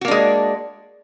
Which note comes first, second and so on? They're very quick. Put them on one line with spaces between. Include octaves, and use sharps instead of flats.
F#4 A#3 D4 G#3